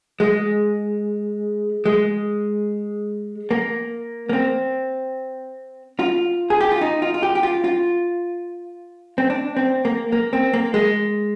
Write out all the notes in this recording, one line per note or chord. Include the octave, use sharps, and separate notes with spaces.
G#3
G#3
A#3
A#3
C4
F4
G#4
G4
F4
D#4
F4
F4
G4
G4
F4
F4
C4
D4
C4
A#3
A#3
C4
A#3
G#3